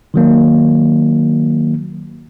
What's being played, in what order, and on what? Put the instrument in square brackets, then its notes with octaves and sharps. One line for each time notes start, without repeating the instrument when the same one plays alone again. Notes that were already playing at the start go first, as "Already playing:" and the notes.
[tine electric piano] D#3 F#3 A#3